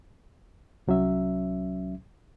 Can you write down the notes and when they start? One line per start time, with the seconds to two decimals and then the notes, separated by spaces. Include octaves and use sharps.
0.88 C2 F#3 C#4 E5